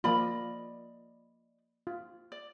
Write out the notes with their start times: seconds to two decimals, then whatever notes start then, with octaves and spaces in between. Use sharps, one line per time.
0.04 F3 A#3 F4 D5 D#5 B5
1.87 F4
2.32 D5